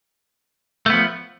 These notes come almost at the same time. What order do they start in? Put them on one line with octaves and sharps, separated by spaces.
A3 B3 F3